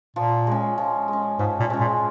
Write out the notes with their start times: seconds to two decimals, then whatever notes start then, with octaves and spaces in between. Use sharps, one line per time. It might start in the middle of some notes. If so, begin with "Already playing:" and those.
0.16 A#2 F3
0.47 G#3 C#4
0.78 F3
1.08 G#3
1.13 C#4
1.39 G#2 F3
1.60 A#2
1.70 G#3 C#4
1.80 A#2